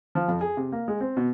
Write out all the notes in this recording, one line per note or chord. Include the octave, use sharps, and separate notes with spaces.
F3
F2
G#4
C3
A#3
G#3
C4
B2